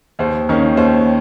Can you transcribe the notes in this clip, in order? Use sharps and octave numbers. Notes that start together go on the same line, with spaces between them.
D#2 C5
D#3 A#3 C#4
D#2 C5